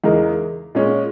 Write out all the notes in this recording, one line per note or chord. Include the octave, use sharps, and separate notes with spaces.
E2 C#3 G#3 D#4 A#4
A#2 G#3 C#4